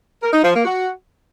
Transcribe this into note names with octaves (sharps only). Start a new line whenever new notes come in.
A#4
D#4
F3
A#3
F#4